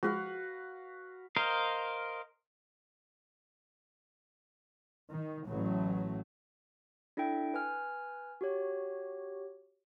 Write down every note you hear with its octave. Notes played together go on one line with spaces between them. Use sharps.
F3 G#3 F#4 B4 F5
A#4 C5 D#5 F5
D#3
A1 F#3 A3
D4 E4 A4 E5 G5
B4 G#5 F6
F#4 G4 C#5